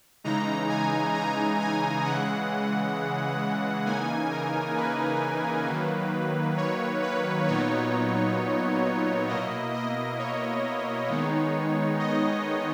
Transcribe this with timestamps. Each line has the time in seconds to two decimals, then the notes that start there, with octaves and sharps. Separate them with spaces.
0.24 C#3 E3 G#3 D#4 A#5
0.69 G#5
1.15 A#5
1.60 G#5
2.05 C#3 E3 G#3 F#5
3.86 C#3 E3 A#3 D#4 G#5
4.31 A#4
4.76 B4
5.67 D#3 F#3 A#3
6.57 C#5
7.02 B4
7.47 A#2 F#3 B3 D#4 C#5
9.28 B2 A#3 E4 D#5
9.73 D#5
10.19 C#5
11.09 D#3 G#3 B3 D#4
11.99 D#5